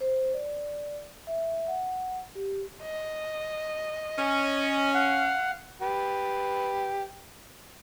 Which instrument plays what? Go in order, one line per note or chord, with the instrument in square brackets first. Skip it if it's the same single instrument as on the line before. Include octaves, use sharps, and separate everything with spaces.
[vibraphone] C5
D5
E5
F#5
G4
[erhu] D#5
[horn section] C#4
[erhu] F5 [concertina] F#5
[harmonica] G4 B4